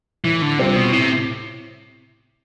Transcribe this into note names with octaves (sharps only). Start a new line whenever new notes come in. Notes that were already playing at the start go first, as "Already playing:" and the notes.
A2 E3
D3
C3 G3 C4 F4 C5
B2
A2 C3